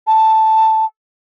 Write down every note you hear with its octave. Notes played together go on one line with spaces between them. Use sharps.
A5